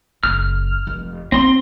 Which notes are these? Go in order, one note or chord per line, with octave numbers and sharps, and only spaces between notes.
F#1 F6
F1
C4 D#4 C6